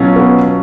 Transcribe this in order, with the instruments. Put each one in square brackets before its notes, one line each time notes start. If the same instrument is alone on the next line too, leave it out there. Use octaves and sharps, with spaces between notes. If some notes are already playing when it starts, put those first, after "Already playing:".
Already playing: [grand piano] B2 F#3 C#4 F4
[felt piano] B3